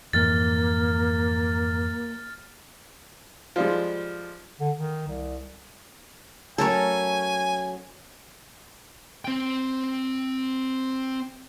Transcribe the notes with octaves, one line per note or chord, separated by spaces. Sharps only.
F2 G#2 E3 A#3 F6 A6
F3 G3 G#3
D3
D#3
C2
F#3 A3 C#4 A4 A#4 C#5 G#5
C4 G5